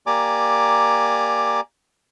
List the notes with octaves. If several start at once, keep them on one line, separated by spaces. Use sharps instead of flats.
A#3 G4 D5 G#5 A#5 D6